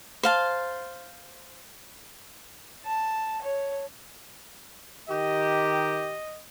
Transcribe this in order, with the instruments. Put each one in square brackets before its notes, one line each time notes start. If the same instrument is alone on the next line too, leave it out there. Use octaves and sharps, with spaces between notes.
[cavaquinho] C5 F5 A5
[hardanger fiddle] A5
C#5
[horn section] D#3 G4 [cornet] D#5